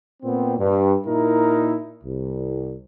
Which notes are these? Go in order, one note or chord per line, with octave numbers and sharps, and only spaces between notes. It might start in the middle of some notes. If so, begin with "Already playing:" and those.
A#2 B3 C4
G2
A#2 D#4 E4 A#4
C2